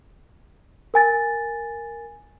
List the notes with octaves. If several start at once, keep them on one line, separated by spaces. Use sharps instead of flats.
A#4 G#5 A6